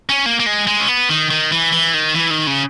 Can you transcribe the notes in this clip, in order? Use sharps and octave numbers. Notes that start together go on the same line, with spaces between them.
C#4
A#3
A#3
G#3
G#3
C#4
B3
D#3
D#3
E3
E3
D#3
E3
D#3
C#3